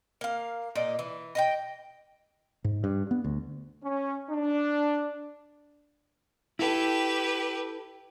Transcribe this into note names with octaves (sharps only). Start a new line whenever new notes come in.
A#3 F5
A#2 D#4 D5
E3
D#5 F5 G5
G#2
G2
B3
D2
C#4
D4
E4 G4 A4 B4